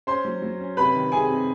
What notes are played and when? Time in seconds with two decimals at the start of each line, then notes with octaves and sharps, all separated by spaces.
0.07 C#4 C5 C6
0.25 F#3
0.42 F#3
0.60 C#4
0.77 C3 B4 B5
0.95 D#3
1.12 C3 G#4 G#5
1.30 C3